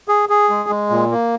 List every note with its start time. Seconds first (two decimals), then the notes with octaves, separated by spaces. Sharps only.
0.08 G#4
0.29 G#4
0.49 G#3
0.69 G#3
0.90 A#2
1.11 A#3